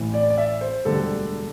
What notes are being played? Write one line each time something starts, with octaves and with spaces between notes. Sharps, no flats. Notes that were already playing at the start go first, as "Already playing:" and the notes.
Already playing: A1 A2 E3
D5
D5
E5
C5
E1 D2 D3 G3 A4